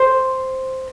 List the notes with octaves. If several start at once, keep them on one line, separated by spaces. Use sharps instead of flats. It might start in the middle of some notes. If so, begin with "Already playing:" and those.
Already playing: C5